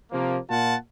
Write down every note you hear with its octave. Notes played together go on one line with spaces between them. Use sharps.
C3 F3 A#3
A#2 F4 F#5 A5